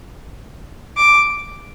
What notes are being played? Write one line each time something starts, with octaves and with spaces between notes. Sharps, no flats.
D6